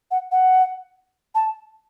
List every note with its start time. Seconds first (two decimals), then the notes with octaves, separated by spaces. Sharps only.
0.11 F#5
0.32 F#5
1.35 A5